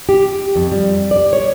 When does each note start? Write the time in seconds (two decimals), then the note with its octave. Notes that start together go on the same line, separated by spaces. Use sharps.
0.09 G4
0.56 F2
0.72 G3
1.11 D5
1.33 C#5